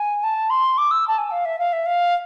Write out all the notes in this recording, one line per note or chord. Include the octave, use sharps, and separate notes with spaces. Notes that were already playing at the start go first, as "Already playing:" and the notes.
Already playing: G#5
A5
C6
D6
E6
A5
G#5
F5
E5
F5
E5
F5